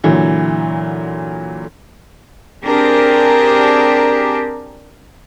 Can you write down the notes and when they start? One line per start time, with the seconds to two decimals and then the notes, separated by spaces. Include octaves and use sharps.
0.04 A#2 D3 E3 F#3
2.64 C4 D4 G4 G#4 A#4